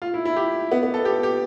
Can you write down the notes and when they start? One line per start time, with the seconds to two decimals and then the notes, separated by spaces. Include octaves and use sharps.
0.02 F4
0.14 E4
0.25 E4
0.36 G4
0.71 B3
0.83 B3
0.94 A4
1.05 G4
1.23 G4